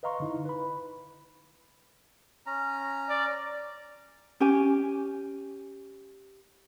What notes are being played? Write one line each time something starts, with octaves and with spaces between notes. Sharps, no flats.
B4 D#5 F5 A#5 C6 C#6
D3 D#4 E4
B4 B5
C#4 A#5
D5
C#4 G4 G#5